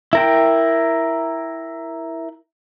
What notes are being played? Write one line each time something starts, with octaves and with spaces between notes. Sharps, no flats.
E4 A#4 G5